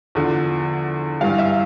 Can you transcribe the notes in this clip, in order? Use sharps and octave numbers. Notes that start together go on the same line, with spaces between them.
E2 D3 F3
G2 E3 G3 F5
E5